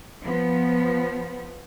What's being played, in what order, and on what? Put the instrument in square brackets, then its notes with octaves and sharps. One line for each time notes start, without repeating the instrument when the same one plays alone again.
[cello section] F3 B3